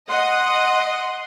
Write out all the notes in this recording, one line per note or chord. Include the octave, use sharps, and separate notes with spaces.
D#5 F#5 C6